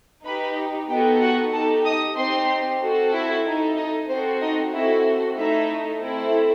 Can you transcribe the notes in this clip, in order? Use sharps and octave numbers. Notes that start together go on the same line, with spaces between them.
D#4 G4 B4 B5
B3 D#4 F#4 G4 A4 G5
F#4 F#5
D#4 G4 A4 A5
D#5 D#6
C4 D#4 G4 C5 C6
C4 F#4 A4
E4 E5
D#4 A4
D#4 D#5
C4 F#4 A4 C5
D#4 D#5
C4 E4 F#4 A4 E5
A3 D#4 E4 A4 E5
A3 C4 E4 A4